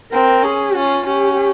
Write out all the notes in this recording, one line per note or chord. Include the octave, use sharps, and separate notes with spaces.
C4 A#4
C#4 G#4
C#4 F4
C#4 G4